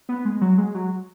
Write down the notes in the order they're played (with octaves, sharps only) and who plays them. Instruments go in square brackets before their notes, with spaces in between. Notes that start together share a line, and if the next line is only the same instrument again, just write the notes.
[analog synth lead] B3
G#3
F#3
G#3
F#3